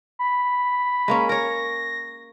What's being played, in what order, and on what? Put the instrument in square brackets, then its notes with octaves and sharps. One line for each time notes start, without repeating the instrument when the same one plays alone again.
[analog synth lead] B5
[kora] G#3 A#3 C#4
[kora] A#4 C#5 [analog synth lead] A#6